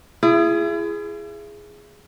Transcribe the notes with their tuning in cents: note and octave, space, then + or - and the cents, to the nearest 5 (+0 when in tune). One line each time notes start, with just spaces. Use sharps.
E4 +40 G#4 +0